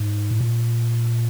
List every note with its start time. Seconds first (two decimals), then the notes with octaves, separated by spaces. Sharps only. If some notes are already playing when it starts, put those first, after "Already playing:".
Already playing: G#2
0.31 A2
0.40 A#2